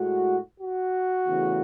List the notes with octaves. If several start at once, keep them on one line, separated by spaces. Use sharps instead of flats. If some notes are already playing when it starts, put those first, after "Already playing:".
Already playing: A2 G#3 F#4
F#4
E2 C#3 E3 A3